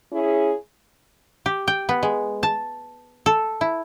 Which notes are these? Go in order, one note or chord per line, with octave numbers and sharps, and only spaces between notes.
C#4 E4 G#4
G4
G5
B3
G#3
A5
A4
E4